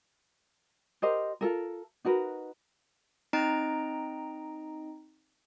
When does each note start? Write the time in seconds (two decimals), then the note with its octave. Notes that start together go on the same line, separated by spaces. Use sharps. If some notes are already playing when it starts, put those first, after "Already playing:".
1.02 G4 A#4 C5 D#5
1.41 F4 A4 A#4
2.05 D#4 F#4 A#4 B4
3.33 C4 D#4 D#5 A#5 D7